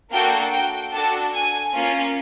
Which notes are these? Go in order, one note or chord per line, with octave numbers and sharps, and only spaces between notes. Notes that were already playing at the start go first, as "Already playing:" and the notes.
A#3 D4 F#4 A4 G5
G5
D4 F#4 A4 A5
G#5
A#3 C#4 F4